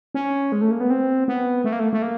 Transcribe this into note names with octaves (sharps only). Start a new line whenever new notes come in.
C#4
G#3
A3
A#3
B3
C4
B3
A3
A#3
A3
A3
A#3